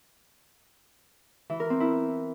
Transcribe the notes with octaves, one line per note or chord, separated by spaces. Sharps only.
E3
A#4
C4
E4